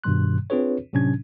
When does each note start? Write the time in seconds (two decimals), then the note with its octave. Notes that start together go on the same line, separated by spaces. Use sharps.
0.04 G2 B2 D#3 G3 C6 F#6
0.50 C4 D4 F4 G#4 B4 C#5
0.93 A2 C3 F#3 C#4 D4 G#6